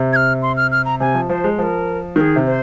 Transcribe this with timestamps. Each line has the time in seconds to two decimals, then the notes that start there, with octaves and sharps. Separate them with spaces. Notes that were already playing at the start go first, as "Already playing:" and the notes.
Already playing: C3
0.13 G#6
0.16 F6
0.42 C6
0.57 F6
0.72 F6
0.85 A#5
1.00 C3 G#5
1.14 F3
1.29 F3 C5
1.44 G#3
1.58 F3 A#4 C5
2.16 D#3 A#4
2.21 G#4
2.36 C3
2.46 C5